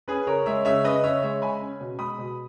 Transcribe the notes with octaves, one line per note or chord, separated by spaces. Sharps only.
C#4 G#4 B4
C#3 A#4 C#5
G#3 C#5 E5
C#3 C#5 E5
C#4 B4 D#5
C#3 C#5 E5
G#3 C#5 E5
C#3 G#5 B5
C#4
B2
G#3 B5 D#6
B2